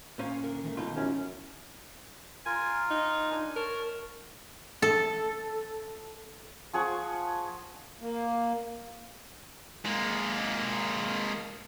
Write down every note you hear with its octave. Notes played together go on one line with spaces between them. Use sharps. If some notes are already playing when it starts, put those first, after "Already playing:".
A#2 C#4 C5 F5
D3 A#4
D#3 G#3 A3
B2 D#4 F4
F#2 F3 C#4 E4 G4
F4 A#4 G#5
D#4
D4 G#5
A#4 C#5 A5
A4
F3 G#4 F#5 C#6
A#3
G#3 A#3